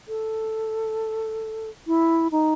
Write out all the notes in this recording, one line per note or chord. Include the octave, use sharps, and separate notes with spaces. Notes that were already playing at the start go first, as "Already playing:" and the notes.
A4
E4
D#4